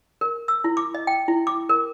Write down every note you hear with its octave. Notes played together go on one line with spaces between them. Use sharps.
A#4
E6
E4
D6
D#5
G5
E4
D6
A#4